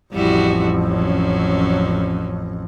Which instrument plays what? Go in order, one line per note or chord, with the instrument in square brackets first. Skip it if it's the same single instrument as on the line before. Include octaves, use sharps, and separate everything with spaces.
[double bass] A1 F2 [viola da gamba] G3 E4 F#4
[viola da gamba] F#3 C#4